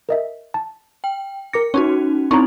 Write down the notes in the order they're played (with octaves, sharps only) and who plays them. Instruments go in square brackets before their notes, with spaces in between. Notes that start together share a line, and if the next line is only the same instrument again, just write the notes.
[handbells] A#4 D#5 E5
A5
[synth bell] G5
[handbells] A#4 D6 A#6 [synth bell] C#7
[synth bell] C#4 D#4 F#4 [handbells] C#5 A5 C#6
[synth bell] C4 D#4 E4 [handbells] A#5 C6 C#6